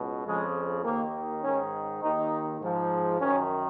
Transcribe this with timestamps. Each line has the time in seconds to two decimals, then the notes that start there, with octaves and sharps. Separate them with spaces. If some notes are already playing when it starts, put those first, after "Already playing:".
Already playing: C#2 B2
0.26 F2 C#3 F3 G#3
0.84 D#2 D#3 A#3
1.43 G#2 D#3 C#4
2.02 D#2 D#3 D#4
2.61 G#2 F3
3.20 F#2 D#3 C#4